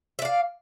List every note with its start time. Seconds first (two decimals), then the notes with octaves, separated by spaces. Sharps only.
0.19 E5
0.22 D5
0.25 F5